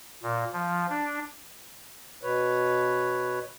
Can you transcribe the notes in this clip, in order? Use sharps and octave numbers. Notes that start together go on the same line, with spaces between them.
A#2
F3
D4
B2 B4 C#5